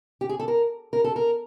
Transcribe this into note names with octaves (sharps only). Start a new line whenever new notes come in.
G4
G#4
A4
A#4
A#4
A4
A#4